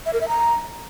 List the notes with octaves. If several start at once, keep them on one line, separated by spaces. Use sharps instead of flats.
E5
A#4
E5
A#5